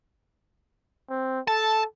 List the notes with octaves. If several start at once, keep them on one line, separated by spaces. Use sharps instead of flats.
C4
A4 A5